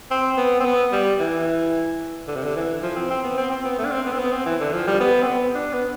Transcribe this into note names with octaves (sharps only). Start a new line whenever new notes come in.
C4
B3
C4
B3
G3
E3
D3
C3
D3
E3
F3
C4
C4
B3
C4
C4
B3
A3
D4
C4
B3
C4
B3
C4
E3
D3
F3
G3
B3
C4
B3
D4
B3